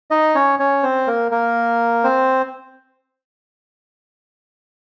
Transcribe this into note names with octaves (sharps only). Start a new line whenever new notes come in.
D#4 D#5
C#4 C#5
C#4 C#5
C4 C5
A#3 A#4
A#3 A#4
C4 C5